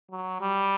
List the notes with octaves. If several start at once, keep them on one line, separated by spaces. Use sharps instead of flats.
F#3
G3